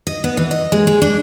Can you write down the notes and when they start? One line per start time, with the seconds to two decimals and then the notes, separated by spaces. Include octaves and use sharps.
0.07 D#5
0.24 B3
0.37 E3
0.51 D#5
0.72 G#3
0.87 G#3
1.02 D4